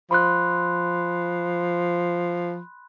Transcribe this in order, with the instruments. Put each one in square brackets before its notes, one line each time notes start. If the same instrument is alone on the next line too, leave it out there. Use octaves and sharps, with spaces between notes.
[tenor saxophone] F3 [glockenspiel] B5 C6 F#6